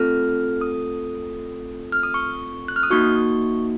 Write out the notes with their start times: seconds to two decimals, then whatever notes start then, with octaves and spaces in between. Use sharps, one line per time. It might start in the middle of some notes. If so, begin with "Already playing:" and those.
Already playing: A3 C4 F4 A4 F6
0.61 D#6
1.92 F6
2.03 D#6
2.14 C#6
2.68 F#6
2.76 F6
2.83 D#6
2.90 A#3 D#4 F#4 C#6